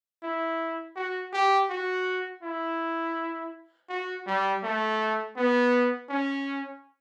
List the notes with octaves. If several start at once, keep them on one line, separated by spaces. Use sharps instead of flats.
E4
F#4
G4
F#4
E4
F#4
G3
A3
B3
C#4